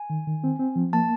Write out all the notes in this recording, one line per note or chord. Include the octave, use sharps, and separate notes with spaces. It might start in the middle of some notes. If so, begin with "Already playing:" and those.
Already playing: G#5
D#3
D#3
C4
C4
F3
A#3 A5